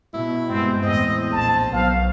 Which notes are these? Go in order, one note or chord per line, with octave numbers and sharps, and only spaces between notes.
B2 E4
G2 B2 G#3 C4
E2 A2 C4 D#5
A#1 A5
B1 F5